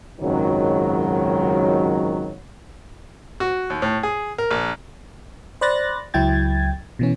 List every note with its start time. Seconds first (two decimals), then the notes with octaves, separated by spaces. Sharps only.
0.21 G#1 C#2 F#2 D#3 F#3
3.40 F#4
3.70 D#2
3.82 A2
4.03 G#4
4.38 A#4
4.51 A#1
5.61 C5 D5 B5 F#6 A6 A#6
6.14 C#2 F#3 E4 G5 G#6 A6
6.99 B2 E3 C#4